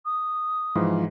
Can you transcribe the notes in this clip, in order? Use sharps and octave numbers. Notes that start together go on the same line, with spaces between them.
D#6
G#2 E3 F3